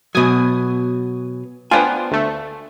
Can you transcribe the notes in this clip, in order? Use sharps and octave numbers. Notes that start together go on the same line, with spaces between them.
B2 F#3 G#5 D#6
B3 D4 F4 C5 G5 G#5
D2 A3